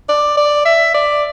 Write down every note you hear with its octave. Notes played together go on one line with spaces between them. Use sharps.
D5
D5
E5
D5